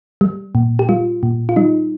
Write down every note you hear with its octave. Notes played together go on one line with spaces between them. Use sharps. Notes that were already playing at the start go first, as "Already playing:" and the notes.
G3
A#2
G4
G3 F4
A#2
F4
G3 D#4